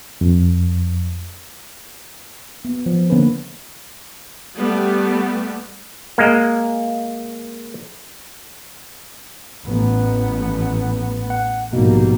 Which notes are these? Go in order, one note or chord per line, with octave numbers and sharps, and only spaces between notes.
F2
B3
F3
D3 A#3 B3 C#4 B4
G3 A3 B3
G#3 A#3
A1 B3
F#5
A#1 G#2 B2 G3 A#3